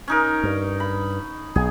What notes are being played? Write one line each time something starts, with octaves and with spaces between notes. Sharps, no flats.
C#4 D#4 A#4
G2
B5
B1 G#4